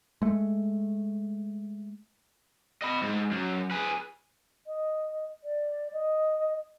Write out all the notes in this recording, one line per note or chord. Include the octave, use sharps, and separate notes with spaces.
G#3 A3
D#5 B5
G#2
F#2
G#4 B4
D#5
D5
D#5